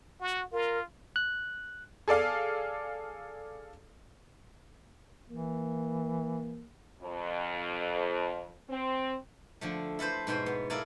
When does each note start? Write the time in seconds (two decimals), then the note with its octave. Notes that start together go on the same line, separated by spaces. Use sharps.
0.21 F#4
0.52 F4 A#4
1.16 F#6
2.08 G#4 A4 D5 F5
5.30 E3 A#3
7.01 F2
8.70 C4
9.61 D3 F3 A3
9.99 E4 A4 B4 C5
10.27 G#2 B2 C5 G#5
10.46 B3
10.70 E4 A4 A#4 D5 F5 G#5